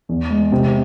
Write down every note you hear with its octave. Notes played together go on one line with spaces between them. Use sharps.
E2
G#3
C3